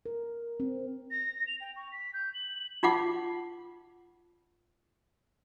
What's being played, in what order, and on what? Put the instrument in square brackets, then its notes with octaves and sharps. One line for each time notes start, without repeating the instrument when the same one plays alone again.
[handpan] A#4
C4
[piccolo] A#6
F7
G5
C#6
B6
G6
F#7
[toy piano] D#4 F4 F#5 D6